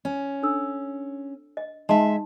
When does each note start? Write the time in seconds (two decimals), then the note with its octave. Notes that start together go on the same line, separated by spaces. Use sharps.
0.05 C#4
0.43 D4 A4 E6
1.57 D#5
1.89 G#3 D#4 E5 A5 C6